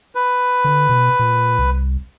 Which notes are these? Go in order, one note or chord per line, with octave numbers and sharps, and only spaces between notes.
B4
D3
B2
A#2
C2